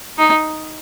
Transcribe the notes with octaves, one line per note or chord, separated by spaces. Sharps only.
D#4